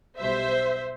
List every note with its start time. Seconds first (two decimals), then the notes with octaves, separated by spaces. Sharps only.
0.18 B1 B2 G3 C5 E5